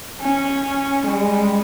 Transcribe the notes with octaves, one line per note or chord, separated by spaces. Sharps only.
C#4
G3 G#3